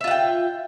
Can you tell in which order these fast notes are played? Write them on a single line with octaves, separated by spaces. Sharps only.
E5 F4 F#5 G5